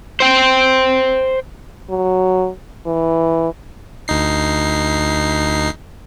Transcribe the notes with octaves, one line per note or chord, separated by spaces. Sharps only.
C5 G5
F#3
E3
D2 D#4 C7